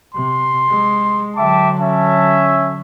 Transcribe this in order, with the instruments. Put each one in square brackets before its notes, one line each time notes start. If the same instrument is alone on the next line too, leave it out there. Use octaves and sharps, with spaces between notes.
[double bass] C3 [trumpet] C6
[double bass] G#3
[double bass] D3 F#3 [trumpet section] E5 G5 D6 [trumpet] A5
[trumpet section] C#4 E5 [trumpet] A5